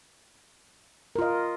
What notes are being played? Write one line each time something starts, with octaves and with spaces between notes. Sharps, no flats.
F4 A#4 D#5